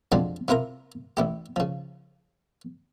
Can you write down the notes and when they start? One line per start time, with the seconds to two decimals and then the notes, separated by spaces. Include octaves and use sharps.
0.12 F2 F3 F#3 G#3 C4 D4
0.48 C3 E4 F4 A#4 A#5
1.17 A1 E4 G4
1.56 C#3 F3